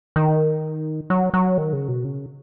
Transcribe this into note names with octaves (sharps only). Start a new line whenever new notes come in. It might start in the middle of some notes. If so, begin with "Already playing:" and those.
D#3
F#3
F#3
D#3
C#3
B2
C#3